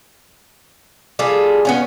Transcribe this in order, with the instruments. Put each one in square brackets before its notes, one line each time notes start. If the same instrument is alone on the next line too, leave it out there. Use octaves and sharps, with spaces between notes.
[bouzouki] G3 F4 G#4 A4
B3 C#4 F4